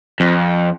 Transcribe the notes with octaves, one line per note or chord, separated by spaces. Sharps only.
F2